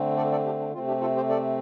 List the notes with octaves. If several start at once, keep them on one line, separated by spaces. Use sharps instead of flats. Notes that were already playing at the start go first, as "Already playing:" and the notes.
Already playing: D3 A3 C4
A4 D5
A4 D5
D4 G4
D4
C3 A3 C4 F4
D4 G4
F4 A4
G4 C5
A4 D5